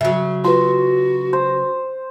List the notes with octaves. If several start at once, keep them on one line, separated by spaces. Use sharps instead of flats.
C#3 F#3 E5
F4 F#4 B4 C6
C5